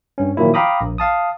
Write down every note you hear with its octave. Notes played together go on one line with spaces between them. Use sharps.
G2 C#4
A#2 D#3 F3 F#3 A#3 E4
F5 G5 A#5 B5 D6 D#6
A#1
F5 A5 D#6